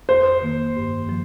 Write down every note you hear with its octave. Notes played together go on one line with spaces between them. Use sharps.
F2 C5
D#3 A#3
G2
F3